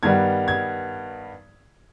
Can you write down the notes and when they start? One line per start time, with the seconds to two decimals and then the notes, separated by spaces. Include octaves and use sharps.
0.03 G2 D#3 G3 B3 G#6
0.48 G#6